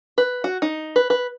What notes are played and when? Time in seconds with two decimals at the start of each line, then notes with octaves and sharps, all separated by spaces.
0.18 B4
0.44 F#4
0.62 D#4
0.96 B4
1.10 B4